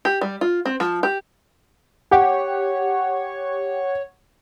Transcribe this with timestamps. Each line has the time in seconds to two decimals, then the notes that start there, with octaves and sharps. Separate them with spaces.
0.05 G4
0.21 G3
0.41 F4
0.65 C4
0.80 F3
1.03 G4
2.11 G4 C#5 F#5